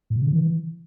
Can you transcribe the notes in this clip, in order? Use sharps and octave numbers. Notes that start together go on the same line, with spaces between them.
A2
B2
C#3
D3
E3